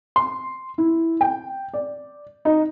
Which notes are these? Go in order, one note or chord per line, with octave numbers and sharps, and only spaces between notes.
C6
E4
G5
D5
D#4